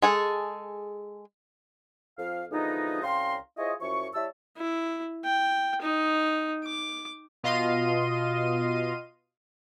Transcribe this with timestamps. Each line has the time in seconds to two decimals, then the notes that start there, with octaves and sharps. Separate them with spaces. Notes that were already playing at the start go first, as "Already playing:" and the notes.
0.02 G#3 G#4 A4
2.18 F2 F5
2.52 D3 E3 F3 G#3 B3 D#4
3.03 C2 C#4 F5 G5 A#5 C6
3.57 E4 F4 G#4 C5 C#5 D#5
3.81 F#2 F3 E4 C#5 C#6
4.15 G3 E4 C#5 E5 A5 E6
4.58 E4
5.25 G5
5.81 D#4
6.64 D6
7.43 B2 F4 D#5 F5 C6 D#7